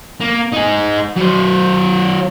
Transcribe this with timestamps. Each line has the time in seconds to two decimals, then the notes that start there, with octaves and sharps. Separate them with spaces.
0.20 A#3
0.52 D#4 G#4
1.16 F#3 C5